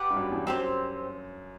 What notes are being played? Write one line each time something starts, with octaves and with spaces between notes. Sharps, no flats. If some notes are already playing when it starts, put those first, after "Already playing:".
Already playing: G4 B4 D5 F#5
G2
F#2
E2
F#2 C4 G4 C5